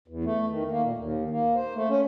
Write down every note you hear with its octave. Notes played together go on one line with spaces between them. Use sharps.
E2
A3
D#3
A#3
A#2
D#2
A#3
C5
A3
C#4